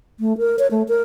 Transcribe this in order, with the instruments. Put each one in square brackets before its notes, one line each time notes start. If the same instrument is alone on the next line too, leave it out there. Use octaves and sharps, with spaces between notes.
[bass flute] A3
A#4
C#5
A3
A#4